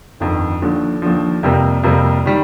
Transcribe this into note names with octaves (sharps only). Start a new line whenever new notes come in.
G1 F2 D#3
D#2 D3 F3
D#2 D3 F3
F2 C3 G3 A#3
F2 C3 G3 A#3
D#3 G3